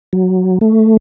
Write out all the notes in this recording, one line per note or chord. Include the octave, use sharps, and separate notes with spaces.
F#3
A3